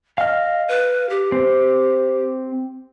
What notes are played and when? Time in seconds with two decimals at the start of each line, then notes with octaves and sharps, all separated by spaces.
0.18 D#5 F5 F6
0.69 B4
1.10 G4
1.32 C4